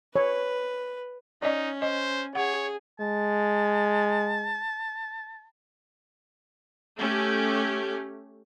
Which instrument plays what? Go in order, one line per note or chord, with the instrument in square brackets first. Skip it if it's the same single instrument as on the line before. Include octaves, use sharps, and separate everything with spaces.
[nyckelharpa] B4 [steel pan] C#5
[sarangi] C#4 [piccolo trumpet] D#4 [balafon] D5 D#5
[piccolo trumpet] C5 [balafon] D#5
[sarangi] G#4 [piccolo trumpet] C#5 [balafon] F#5
[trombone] G#3 [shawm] A5
[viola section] A3 C#4 G4